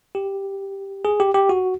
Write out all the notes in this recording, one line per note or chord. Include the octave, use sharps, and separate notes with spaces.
G4
G#4
G4
G4
F#4